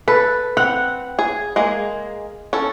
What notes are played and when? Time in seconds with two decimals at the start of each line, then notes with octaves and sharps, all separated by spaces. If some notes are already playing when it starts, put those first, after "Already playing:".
0.08 A4 B4
0.57 C4 F#5
1.19 G#4
1.56 G#3 A#3 G#4
2.53 C#4 A4